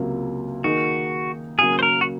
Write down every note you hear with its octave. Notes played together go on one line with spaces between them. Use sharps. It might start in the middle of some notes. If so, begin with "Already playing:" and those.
Already playing: C#2 C3 F#3 A#3 F4
D#3 A#3 D#4 F#4 G#4
C#3 F#3 A#3 G#4
C5
A#4
F#4